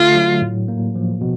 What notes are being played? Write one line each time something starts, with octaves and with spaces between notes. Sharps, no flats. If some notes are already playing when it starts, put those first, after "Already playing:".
Already playing: D3 A3 F4
F#3
A2
A#3
F3
B2